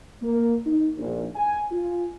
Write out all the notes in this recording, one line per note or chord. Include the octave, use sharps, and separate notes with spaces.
A#3
D#4
A#1
G#5
F4